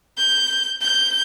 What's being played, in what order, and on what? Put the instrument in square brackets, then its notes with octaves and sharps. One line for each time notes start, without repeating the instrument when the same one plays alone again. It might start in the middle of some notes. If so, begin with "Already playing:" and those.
[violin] G6
G6